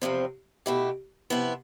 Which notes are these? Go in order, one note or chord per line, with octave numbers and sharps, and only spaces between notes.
E2 C3 F3 C4
B2 A3 E4 G4
C3 F3 B3 E4